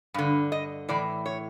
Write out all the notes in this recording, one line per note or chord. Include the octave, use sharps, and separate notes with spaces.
G2 D3
D#5
A2 E3 D5
C#5